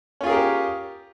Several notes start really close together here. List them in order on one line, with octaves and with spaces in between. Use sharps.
C#4 F4 G#4 A#4 G4